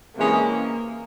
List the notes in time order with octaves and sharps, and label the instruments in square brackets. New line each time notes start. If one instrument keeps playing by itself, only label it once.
[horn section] C3 E3 G#3 C#4 [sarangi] A#3